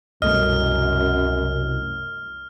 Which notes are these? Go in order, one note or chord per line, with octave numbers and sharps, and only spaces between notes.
C2 F#2 B2 A3 D#5 F6